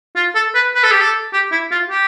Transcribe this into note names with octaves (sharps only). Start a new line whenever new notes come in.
F4
A4
B4
B4
A4
G4
A4
G4
E4
F4
G4